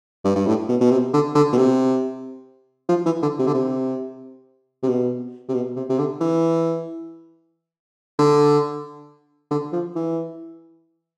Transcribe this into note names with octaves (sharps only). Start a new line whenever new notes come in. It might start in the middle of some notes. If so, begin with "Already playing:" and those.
G2
G2
A2
B2
B2
C3
D3
D3
B2
C3
F3
E3
D3
C3
D3
C3
C3
B2
C3
B2
C3
C3
D3
E3
D3
D3
F3
E3